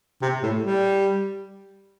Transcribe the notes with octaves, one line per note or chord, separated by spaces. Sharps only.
C3
A2
G3